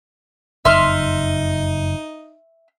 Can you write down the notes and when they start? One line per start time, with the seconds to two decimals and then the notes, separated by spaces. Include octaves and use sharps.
0.65 F#1 F2 D#4 E5 C6 F6